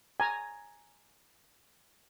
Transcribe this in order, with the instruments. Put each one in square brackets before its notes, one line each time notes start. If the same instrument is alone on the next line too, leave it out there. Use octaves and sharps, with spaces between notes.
[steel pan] G#5 A#5